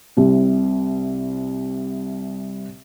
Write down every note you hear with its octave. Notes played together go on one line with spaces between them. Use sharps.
C2 C3